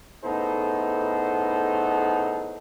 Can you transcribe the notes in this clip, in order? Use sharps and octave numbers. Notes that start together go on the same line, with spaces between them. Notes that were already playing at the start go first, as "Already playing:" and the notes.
A2 C#3 B3 D#4 A4 C5